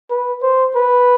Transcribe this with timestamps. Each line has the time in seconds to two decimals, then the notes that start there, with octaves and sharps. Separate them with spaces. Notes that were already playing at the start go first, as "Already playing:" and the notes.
0.10 B4
0.42 C5
0.75 B4